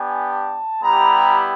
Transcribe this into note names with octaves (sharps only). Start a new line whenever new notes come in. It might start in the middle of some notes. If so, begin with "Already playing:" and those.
Already playing: B3 D4 G4 G#5
A5
G3 B3 E4 G4 A#5